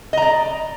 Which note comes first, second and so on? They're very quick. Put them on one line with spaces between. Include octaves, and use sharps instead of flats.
D#5 A#5 D5